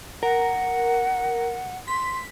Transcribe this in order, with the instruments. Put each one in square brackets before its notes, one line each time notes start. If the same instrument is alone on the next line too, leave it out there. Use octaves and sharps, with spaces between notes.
[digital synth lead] A#4 [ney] F#5
[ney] C6 [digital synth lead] B6